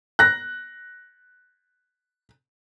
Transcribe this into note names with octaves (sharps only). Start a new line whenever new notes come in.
F#6 A#6